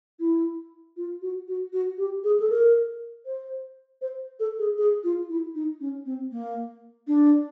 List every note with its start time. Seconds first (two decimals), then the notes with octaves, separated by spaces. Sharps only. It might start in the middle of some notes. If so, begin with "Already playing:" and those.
0.20 E4
0.97 F4
1.22 F#4
1.48 F#4
1.73 F#4
1.98 G4
2.24 G#4
2.40 A4
2.50 A#4
3.26 C5
4.01 C5
4.40 A4
4.59 G#4
4.78 G#4
5.04 F4
5.29 E4
5.55 D#4
5.81 C#4
6.05 C4
6.32 A#3
7.07 D4